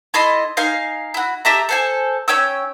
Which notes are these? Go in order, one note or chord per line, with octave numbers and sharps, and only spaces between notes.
E4 A4 D#5 C6
D#4 F5 G#5
E4 F#4
G4 A4 E5 A#5
A4 C5 G#5
C#4 C#5 G5 E6